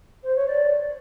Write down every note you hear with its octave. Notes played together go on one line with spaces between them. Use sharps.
C5
C#5
D5